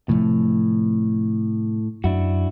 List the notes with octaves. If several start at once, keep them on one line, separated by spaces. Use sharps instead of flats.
A2 C3 F3 A3
F#2 D4 E4 F#4